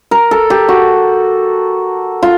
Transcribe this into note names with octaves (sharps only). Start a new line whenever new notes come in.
A#4
A4
G4
F#4
F4